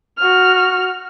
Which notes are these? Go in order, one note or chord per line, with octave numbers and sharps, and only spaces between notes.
F#4 F6